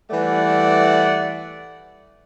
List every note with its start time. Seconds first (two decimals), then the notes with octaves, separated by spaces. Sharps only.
0.10 E3 G3 A3 B4 D5 F#5